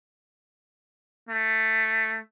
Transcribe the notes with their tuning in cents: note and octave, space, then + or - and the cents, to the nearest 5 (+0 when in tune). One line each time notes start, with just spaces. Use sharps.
A3 +10